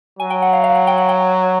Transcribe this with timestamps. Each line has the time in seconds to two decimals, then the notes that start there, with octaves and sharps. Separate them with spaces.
0.19 F#3 G#5
0.30 G5
0.42 F#5
0.53 F5
0.64 F5
0.75 F#5
0.87 G5
0.98 F#5
1.09 G5